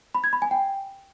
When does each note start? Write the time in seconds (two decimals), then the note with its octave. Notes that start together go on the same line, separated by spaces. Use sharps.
0.15 B5
0.24 G#6
0.33 B5
0.42 G#5
0.51 G5